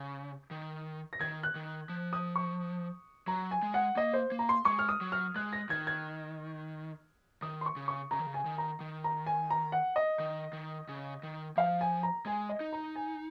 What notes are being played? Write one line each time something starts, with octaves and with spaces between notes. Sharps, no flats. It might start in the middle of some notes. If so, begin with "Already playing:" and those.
Already playing: C#3
D#3
A#6
D#3 G#6
F#6
D#3
F3
D#6
C#6
F#3 A#5
G#5
G#3
F#5
A#3 D#5
C5
A#3
A#5
C6
G#3 C#6
F6
D#6
F#3
F6
G#3 F#6
A#6
D#3 G#6
G#6
D#3 D#6
C6
C#6
C#3
C#6
C#3 A#5
D#3
C#3
G#5
D#3
A#5
D#3
A#5
G#5
A#5
F#5
D#5
D#3
D#3
C#3
D#3
F3 F5
G#5
A#5
G#3 G#5
D#5
D#4
A#5
G#5